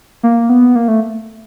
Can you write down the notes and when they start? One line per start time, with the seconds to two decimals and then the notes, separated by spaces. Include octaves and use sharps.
0.23 A#3
0.49 B3
0.75 A#3
0.88 A3